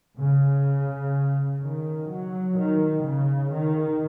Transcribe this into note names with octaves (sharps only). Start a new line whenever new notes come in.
C#3
D#3
F#3
D#3
C#3
D#3